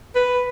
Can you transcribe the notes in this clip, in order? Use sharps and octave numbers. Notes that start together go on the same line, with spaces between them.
B4